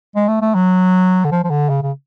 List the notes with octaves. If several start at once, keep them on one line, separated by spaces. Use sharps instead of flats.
G#3
A3
A3
F#3
D3
F3
F3
D3
C#3
C#3